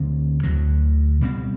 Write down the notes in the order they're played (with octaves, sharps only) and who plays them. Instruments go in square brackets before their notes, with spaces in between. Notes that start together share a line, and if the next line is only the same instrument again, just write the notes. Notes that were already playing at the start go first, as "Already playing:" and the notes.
Already playing: [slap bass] D2 D3 C4
D2 D3 F#3
B2 G3 C4